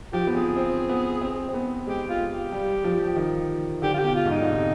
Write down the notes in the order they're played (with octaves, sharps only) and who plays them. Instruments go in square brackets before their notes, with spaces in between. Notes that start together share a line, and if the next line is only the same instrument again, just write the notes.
[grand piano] F3 [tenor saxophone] G4
[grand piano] B3
[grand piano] C4 [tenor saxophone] G#4
[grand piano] C4
B3
C4
C4
B3
[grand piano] G#3 [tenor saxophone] G4
[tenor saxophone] F4
[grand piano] G#3
[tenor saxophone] G4
[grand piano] G3
F3
D#3
[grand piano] D3 [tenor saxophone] G4
[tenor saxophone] F4
G4
[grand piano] B2
[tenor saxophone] F4
[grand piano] G#2
[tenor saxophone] D#4
[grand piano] D3
C3